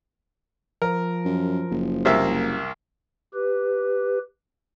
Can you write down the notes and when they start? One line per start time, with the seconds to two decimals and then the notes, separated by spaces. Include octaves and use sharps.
0.82 F3 A#4
1.25 F#2
1.71 F#1
2.05 C2 A#3 E5
3.34 G4 B4